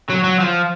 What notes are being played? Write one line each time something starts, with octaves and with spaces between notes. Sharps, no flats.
F#3
F#3
F3